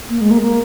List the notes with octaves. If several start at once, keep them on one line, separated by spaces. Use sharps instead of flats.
A#3
G#3
A#3
A#3